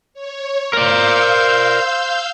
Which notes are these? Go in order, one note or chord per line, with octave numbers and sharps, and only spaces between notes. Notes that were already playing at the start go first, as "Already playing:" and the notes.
C#5
A#4 C5 D5 F5 E6 G6